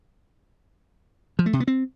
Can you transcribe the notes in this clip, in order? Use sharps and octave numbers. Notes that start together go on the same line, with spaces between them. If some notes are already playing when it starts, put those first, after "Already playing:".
F3
A3
C3
B3
C4